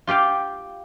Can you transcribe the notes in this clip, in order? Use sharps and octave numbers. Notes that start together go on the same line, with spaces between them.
F4 G4 F5 G5